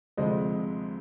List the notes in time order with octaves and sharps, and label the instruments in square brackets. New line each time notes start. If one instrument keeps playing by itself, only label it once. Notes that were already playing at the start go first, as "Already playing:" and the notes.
[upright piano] D2 C3 F3 G#3 C5 D#5